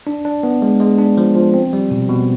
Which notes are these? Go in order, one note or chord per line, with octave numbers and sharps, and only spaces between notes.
D4
D4
B3
G#3
G#3
D4
F3
F3
C4
G3
B2
B2